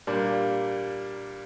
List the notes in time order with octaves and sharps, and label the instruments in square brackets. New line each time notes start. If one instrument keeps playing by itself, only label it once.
[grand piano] A#2 G3 A#3 D4